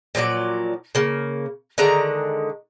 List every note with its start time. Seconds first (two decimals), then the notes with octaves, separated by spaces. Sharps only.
0.15 A#2 F3 F#3 D5
0.95 C#3 A#3
1.78 D3 D#3 G#3 A#5